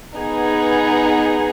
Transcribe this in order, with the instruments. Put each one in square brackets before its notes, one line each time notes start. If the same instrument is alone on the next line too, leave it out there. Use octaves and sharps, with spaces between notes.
[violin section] B3 D#4 G#4